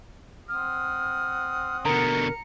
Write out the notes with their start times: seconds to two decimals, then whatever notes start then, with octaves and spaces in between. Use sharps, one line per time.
0.48 C4 F#5 D#6 F6
1.85 B2 D3 A#4 A#5 C#7